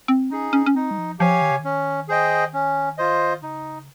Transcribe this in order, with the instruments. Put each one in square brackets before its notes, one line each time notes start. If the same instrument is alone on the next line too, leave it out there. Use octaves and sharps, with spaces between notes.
[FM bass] C4
[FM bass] C#4 [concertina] D#4 G#4
[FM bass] C#4
C#4
[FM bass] C4 [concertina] D#4
[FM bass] G3
F3
[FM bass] F3 [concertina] G4 C#5 F5 G#5
[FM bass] D#3
C#3
[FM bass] D#3 [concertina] C#4
[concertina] G#4 C5 D#5 G5
C#4
F4 C5 D#5
[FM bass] C#3 [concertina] D#4